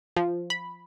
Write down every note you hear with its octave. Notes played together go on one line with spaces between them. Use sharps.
F3
B5